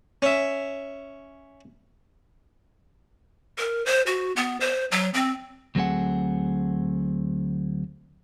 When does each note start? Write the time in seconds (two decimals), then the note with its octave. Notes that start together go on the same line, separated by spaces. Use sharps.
0.22 C#4 E5
3.58 A#4
3.86 C5
4.06 F#4
4.36 B3
4.60 C5
4.92 F#3
5.14 C4
5.75 D2 F#3 A3 C4 G#4 F#5